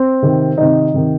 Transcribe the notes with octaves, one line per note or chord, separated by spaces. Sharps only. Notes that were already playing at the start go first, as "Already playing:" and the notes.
Already playing: C4
C3 D#3
C3 D#3 D#4
C3 D#3